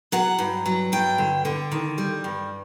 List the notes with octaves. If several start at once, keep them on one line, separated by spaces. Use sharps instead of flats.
F#3 F#5
G2
F#3
G2 G5
D3
D3
D#3
G3
G2